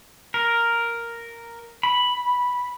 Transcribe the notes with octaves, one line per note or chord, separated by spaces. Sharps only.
A#4
B5